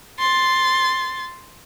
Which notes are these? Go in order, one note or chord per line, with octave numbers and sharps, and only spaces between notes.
C6 A6